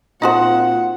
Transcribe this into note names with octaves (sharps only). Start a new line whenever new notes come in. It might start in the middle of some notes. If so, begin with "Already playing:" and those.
A#2 C4 D#4 F4 F#4 C5 F#5